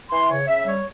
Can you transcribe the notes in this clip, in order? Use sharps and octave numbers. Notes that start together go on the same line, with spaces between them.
E3 C6
C#3 C#5
C#3 E5
G3 C#5